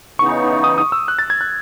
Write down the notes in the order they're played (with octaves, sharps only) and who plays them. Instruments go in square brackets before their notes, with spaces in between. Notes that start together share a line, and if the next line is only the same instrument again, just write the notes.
[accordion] C#3 E3 B3 D#4 [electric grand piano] C#6
[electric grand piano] D#6
D#6
E6
F#6
A6
G#6
F#6